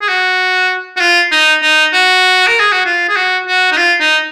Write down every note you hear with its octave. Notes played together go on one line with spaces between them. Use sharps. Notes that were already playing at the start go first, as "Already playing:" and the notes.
G#4
F#4
F#4
F4
D#4
D#4
F#4
A#4
G#4
F#4
F4
G#4
F#4
F#4
D#4
F4
D#4